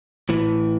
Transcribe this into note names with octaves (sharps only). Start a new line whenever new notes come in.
A2 E3